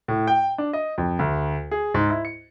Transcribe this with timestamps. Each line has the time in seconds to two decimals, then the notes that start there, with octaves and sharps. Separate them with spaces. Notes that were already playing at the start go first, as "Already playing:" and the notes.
0.08 A2
0.27 G5
0.58 D4
0.73 D#5
0.98 F2
1.19 D2
1.71 G#4
1.94 G#2
2.10 E4
2.25 C#7